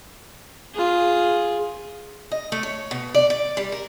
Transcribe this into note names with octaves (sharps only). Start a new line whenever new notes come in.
F4 G#4
D#5
A3
C#5
B2
D5
D5
G3
A#4